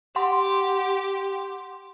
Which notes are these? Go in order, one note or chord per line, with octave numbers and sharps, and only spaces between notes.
G4 F#5 C6